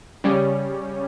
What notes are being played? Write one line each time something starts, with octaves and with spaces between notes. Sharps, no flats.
C#3 G3 C#4